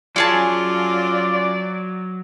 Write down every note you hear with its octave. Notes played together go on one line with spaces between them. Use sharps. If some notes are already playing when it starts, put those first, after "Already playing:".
F#3 C#4 F4 G#4 D5 A5